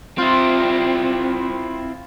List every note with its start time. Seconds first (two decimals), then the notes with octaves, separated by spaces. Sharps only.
0.18 C4 E4 F4